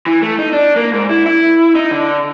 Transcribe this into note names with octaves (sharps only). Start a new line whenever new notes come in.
E3
A3
D#4
D4
A#3
G#2
E4
E4
D#4
D3